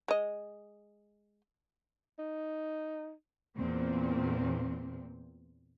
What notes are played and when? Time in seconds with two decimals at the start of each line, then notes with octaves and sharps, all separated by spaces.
0.08 G#3 D#5
2.19 D#4
3.57 E2 A#2 C4